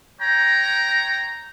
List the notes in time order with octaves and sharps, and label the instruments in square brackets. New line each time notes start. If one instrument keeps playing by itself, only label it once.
[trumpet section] C#5 G5 A#5